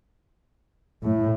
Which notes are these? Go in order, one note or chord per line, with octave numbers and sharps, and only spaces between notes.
A2